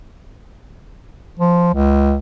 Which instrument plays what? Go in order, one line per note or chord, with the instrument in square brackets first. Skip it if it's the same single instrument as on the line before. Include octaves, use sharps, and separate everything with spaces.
[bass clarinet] F3
C#2